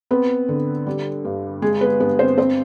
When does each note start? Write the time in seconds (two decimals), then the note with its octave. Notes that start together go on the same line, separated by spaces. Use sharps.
0.11 B3 C4 B4
0.49 D3
0.87 G3
1.25 G2
1.62 G#3 G#4
1.81 B3 B4
2.00 G2 B3 B4
2.19 C4 C5
2.38 C4 C5